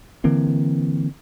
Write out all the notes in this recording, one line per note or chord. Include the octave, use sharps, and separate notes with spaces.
D3 E3 A#3 C4